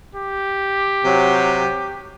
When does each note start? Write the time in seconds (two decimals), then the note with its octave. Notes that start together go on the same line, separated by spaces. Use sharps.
0.14 G4
1.04 C3 F#3